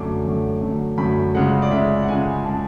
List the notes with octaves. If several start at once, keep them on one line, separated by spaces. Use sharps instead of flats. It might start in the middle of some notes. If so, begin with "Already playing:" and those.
Already playing: F#2 D3 F#3 A3 D6
F#2 D3 F#3 A3
F#2 D3 F#3 A3
F#2 D3 F#3 A3 B5
C#2 C#3 G#3 F#5
D5
C#2 C#3 G#3 E5
F#5
C#2 C#3 G#3 G#5
C#3 G#3 A5